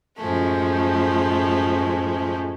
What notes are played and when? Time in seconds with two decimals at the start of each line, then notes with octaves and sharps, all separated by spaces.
0.17 F#2 A2 F3 G#3 A3